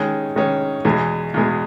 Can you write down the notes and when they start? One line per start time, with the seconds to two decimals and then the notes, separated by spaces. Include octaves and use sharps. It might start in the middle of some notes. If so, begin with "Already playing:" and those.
Already playing: D#3 G#3 C#4
0.36 D#3 G#3 C#4
0.85 E2 B2 G#3
1.34 E2 B2 G#3